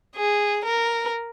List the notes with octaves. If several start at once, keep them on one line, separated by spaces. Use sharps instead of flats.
G#4
A#4